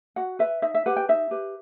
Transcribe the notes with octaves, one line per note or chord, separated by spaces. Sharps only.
F#4 F#5
B4 E5
D#4 E5
E5
G4 B4 F#5
G5
D#4 E5
G4 B4